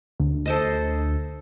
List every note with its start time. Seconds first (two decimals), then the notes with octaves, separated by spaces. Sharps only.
0.20 D2
0.46 A4 C5 D#5